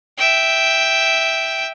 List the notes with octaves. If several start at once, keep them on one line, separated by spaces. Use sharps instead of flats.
E5 G5